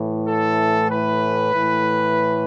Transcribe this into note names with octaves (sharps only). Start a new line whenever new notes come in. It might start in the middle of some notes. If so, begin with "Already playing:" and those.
Already playing: A2 E3
A4
B4
A2 E3